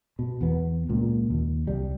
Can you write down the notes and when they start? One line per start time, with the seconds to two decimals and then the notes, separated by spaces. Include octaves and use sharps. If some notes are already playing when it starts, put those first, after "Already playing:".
0.19 B2
0.41 E2 B3
0.89 C#2 A#2
1.30 D#2
1.67 C2 G3